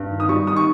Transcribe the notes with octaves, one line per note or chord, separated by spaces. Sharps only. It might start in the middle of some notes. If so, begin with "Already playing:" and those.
Already playing: G2
D#3
D#6
G3 C#6
D#3 D#6
C#6